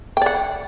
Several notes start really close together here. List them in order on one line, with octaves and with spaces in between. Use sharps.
G5 D5 F#5